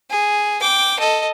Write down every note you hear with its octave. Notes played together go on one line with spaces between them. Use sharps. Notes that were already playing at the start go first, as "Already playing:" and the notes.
G#4
G5 D6
A4 D#5